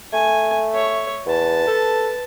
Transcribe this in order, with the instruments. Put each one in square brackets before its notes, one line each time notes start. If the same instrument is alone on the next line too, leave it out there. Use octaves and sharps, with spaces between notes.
[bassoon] A3 [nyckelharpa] G#5
[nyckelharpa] C#5 E5
[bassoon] E2 [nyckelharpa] B4 A5
[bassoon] A4